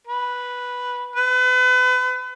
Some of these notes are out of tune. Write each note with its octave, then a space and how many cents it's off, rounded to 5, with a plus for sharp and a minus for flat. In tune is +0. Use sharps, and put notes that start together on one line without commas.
B4 -5
B4 +35